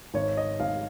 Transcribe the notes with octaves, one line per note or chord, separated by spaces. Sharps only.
G#1 C#5
D#5
G#1 F5